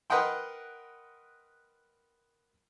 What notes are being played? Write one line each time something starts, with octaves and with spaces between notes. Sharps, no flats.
A#4 B4 D#5 F#5 G5 C6